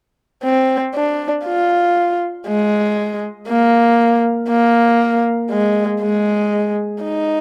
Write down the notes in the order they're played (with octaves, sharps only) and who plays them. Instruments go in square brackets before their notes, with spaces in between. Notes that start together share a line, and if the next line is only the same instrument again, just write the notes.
[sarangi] C4
D4
F4
G#3
A#3
A#3
G#3
G#3
D#4